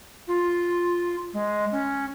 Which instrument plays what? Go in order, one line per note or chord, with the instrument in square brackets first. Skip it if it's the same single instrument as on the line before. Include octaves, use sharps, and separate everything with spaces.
[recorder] F4
G#3
C#4